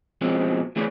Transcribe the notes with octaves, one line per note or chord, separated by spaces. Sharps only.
B2 F3 G#3 C4 C#4
E3 A3 G#4 B4 C#5 D5